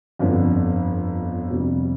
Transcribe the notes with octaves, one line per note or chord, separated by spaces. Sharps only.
G1 F2 D3
F2 C3 G3